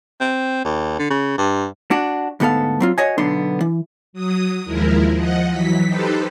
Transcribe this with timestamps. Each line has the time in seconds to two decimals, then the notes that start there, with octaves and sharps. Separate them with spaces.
0.21 C4
0.64 D#2
0.99 D3
1.10 C#3
1.38 G2
1.91 D4 F#4
2.40 D2 G#2 B3 A4 F5
2.80 F#3 C4 F4
2.98 F#4 C#5 D#5 G#5
3.18 B1 D3 B3 D4 C6
3.61 E3
4.13 F#3 D#6
4.64 D#2 F3 G#3 E4 A#4
5.13 F3 D#5 F#5
5.50 E3 F#3 B6
5.84 D#4 G4 A4 B4 C5